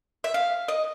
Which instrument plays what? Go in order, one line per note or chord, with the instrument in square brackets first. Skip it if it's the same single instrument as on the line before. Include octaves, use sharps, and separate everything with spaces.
[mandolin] E5
F5
D#5